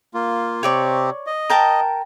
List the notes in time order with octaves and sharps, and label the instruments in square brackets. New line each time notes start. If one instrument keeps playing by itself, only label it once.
[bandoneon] A#3 F4
[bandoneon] C3 C4 G4 [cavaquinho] C#5 D5 C#6
[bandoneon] D#5
[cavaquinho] A#4 G5 A5